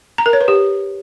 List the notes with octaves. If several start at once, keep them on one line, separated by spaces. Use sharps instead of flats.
A#5
A#4
C#5
B4
G4